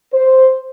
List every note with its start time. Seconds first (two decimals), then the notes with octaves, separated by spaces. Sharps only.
0.13 C5